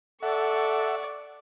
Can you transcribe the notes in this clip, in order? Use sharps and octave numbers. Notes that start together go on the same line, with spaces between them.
A4 D5 E5 F#5 C#6